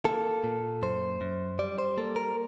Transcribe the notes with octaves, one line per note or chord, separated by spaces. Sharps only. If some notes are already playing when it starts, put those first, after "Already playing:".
A#3 A4
A#2
F#2 C5
F#2
G3 D5
C5
A#3 A4
A#4